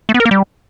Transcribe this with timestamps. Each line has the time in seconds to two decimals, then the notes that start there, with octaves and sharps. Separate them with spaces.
0.09 A3
0.14 B3
0.20 A#4
0.25 A#3
0.31 G3